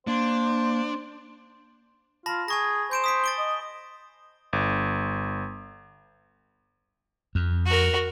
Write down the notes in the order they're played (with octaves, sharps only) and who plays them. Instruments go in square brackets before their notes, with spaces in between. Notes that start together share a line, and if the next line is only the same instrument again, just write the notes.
[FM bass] A#3 [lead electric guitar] D4 [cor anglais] C5
[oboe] F4 [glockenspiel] A5 B5 A#6
[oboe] G#4 [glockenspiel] G#5 C#6 A#6
[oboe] C5 [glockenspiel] G6 D7 E7
[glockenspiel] D#6 B6 D7
A6 D7 G7
[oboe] D#5
[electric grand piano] G1
[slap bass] F2
[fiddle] F#4 A#4